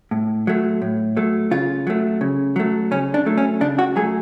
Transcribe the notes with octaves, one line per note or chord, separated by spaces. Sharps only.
A2
F#3 A3
A2
F#3 A3
C#3 F4
F#3 A3
C#3
F#3 A3
C#3 C#4
D4
F#3 A3
C#4
C#3 D4
F#4
F#3 A3 G#4